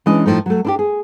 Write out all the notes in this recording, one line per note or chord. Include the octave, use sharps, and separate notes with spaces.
E3 G#3 C#4 D4 D#5
A2 F3 A3 D#4
F#3 A3
D4 E4 G4
G#4